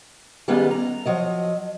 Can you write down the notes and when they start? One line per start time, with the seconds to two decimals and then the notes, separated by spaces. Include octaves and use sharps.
0.48 D#3 G3 G#3 B3 C#4 F4
0.71 A#5
1.06 F3 F#3 D#5